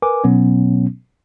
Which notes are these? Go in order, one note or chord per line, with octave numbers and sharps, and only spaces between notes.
A#4 B4 G#5 D6
B2 F#3 B3 C#4